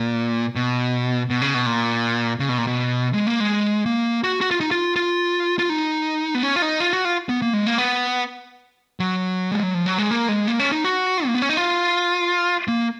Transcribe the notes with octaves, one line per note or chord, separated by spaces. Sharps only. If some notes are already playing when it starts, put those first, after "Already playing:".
Already playing: A#2
B2
B2
C#3
B2
A#2
C#3
B2
A#2
B2
G#3
A#3
G#3
A#3
F#4
F#4
F4
D#4
F4
F4
F4
D#4
B3
C#4
F4
D#4
F4
F#4
F4
B3
A#3
G#3
A#3
B3
F#3
G#3
F#3
F3
F#3
G#3
A#3
G#3
A#3
C#4
D#4
F#4
A#3
B3
C#4
D#4
F4
A#3